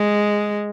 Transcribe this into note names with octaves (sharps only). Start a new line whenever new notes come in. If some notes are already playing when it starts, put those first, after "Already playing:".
Already playing: G#3